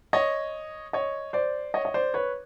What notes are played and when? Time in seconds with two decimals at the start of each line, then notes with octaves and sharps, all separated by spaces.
0.13 C#5 D#5
0.93 C#5 D#5
1.33 C5 D5
1.74 C#5 D#5
1.85 D#5
1.94 C5 D5
2.14 B4 C#5